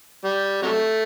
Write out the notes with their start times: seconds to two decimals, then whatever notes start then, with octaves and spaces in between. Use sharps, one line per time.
0.25 G3
0.63 C3 F#3 A3